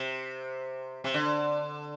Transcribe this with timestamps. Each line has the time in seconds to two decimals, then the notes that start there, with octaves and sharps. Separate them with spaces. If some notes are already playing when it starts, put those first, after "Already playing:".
Already playing: C3
1.04 C3
1.14 D3